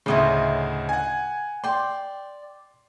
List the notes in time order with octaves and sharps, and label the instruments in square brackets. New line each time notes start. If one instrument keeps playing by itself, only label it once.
[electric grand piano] D2 A2 C#3 [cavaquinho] E4 D#5 C6
[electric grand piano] F#5 G#5
[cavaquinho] D5 G5 [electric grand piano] C6